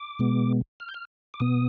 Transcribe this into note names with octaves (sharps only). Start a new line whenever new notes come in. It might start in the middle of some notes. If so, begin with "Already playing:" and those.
Already playing: D6
B2 G#3 B3
F6
G6
F6
D6
B2 B3 D#6